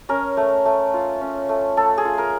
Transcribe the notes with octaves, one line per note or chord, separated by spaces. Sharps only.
C#4 A#4
A3
A3
F4
C#4
A3
A3 A4
G#4
F4
A#4